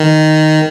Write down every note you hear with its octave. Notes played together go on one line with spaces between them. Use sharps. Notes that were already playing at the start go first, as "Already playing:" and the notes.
Already playing: D#3